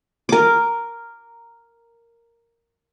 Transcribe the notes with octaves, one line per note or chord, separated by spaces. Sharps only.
A#4 D6